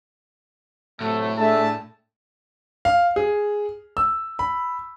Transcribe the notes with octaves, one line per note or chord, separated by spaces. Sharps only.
A2 C3 F#3 A3
A3 D4 G#4 E5 A5
F5
G#4
E6
B5